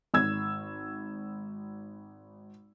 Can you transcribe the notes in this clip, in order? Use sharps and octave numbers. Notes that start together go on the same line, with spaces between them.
G#1 E6 G#6